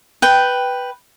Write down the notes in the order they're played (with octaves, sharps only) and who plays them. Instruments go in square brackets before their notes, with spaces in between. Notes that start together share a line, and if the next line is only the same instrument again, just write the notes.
[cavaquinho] B4 G5